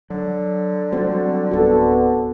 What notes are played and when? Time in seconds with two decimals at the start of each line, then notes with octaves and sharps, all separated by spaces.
0.10 D3 F#3
0.92 F#3 G3 C4 F#4 C5
1.51 D1 B3 F#4 A4